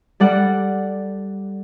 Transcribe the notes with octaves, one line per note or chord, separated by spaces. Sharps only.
G3 A4 D5 F#5